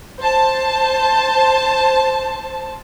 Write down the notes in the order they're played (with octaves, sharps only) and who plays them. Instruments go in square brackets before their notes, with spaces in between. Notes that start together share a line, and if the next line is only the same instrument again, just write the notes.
[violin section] C5 A5